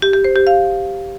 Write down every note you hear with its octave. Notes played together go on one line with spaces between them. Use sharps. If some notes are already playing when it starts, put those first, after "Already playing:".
G4
G4
C5
G4
F5